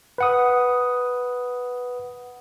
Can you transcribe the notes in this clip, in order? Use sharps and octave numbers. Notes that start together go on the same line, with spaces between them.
B4 F#5 D#6